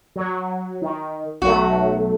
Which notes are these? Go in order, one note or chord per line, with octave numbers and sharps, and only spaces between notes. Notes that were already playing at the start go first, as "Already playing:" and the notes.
F#3
D#3
B1 F#3 A3 F#4